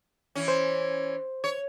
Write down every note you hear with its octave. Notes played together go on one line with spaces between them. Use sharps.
E3 C#4
C5
C#5